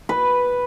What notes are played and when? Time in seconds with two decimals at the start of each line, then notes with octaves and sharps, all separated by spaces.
0.09 B4